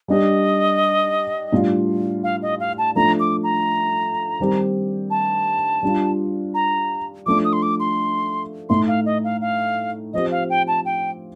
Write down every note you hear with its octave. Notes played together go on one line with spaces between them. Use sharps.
G3 D4 G4 D#5
A2 G3 D4 F4
F5
D#5
F5
A5
F3 A3 D4 A#5
D6
A#5
D#3 G3 C4 G4
A5
G3 D4 F4
A#5
F3 A3 D4 D6
D#6
C6
D6
C6
A2 A3 D#4 C6
F5
D#5
F5
F5
F3 C4 G4 D#5
F5
G5
A5
G5